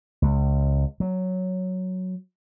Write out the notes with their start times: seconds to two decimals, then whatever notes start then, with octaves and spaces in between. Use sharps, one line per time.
0.22 C#2
1.00 F#3